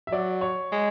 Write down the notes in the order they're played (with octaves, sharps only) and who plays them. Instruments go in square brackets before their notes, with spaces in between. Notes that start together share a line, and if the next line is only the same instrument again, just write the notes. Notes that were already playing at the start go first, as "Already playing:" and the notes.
[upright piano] E5
[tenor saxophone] F#3 [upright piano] D5
[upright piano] C#5
[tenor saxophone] G#3